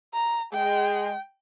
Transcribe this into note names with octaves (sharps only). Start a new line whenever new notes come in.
A#5
G#3 G5